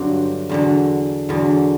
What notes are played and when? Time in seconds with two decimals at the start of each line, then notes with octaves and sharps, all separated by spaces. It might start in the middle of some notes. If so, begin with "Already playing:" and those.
Already playing: G2 D3 F#3 C5
0.49 E2 D3 F#3
1.29 E2 D3 F#3